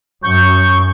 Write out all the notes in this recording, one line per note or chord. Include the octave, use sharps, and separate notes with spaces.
F#2 C#6 G6